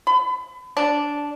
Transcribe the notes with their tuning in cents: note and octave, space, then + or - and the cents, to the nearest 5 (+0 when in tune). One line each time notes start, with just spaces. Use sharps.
B5 +30
D4 -10